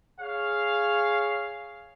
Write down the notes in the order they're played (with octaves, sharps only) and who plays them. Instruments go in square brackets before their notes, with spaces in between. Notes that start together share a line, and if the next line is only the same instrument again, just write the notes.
[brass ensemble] G#4 C#5 F5